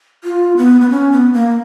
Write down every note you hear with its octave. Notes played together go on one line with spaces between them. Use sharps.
F4
B3
B3
C#4
B3
A#3